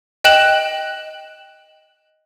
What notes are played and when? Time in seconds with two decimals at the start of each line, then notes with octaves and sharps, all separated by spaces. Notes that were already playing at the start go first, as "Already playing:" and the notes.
0.24 D#5 G5 F#6 E7 F#7